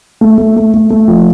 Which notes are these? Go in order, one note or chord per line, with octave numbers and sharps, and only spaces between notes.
A3
A3
A3
A3
A3
F3